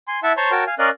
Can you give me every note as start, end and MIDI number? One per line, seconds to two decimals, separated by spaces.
0.08 0.20 80
0.08 0.20 84
0.23 0.32 64
0.23 0.32 76
0.23 0.32 78
0.23 0.32 81
0.37 0.51 72
0.37 0.51 73
0.37 0.51 81
0.37 0.51 82
0.37 0.51 84
0.37 0.51 85
0.51 0.64 66
0.51 0.64 70
0.51 0.64 73
0.51 0.64 79
0.51 0.64 81
0.67 0.75 77
0.67 0.75 80
0.79 0.90 61
0.79 0.90 70
0.79 0.90 74
0.79 0.90 75
0.79 0.90 77
0.79 0.90 90